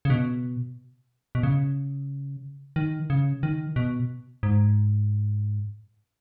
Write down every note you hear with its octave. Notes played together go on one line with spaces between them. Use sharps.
C#3
B2
B2
C#3
D#3
C#3
D#3
B2
G#2